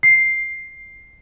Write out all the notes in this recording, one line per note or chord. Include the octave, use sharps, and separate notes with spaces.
C7